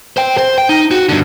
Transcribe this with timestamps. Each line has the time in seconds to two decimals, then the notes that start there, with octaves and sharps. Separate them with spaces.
0.17 C5 G5
0.38 C5
0.58 G5
0.69 D#4
0.91 F#4
1.09 G2 D3